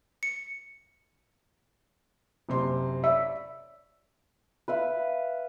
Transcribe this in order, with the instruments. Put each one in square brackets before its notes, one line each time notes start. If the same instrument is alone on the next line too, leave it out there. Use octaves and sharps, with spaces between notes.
[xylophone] C#7
[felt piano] F#1 C3 C6
[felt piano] C#5 D5 [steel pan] E5
[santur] B4 E5 F5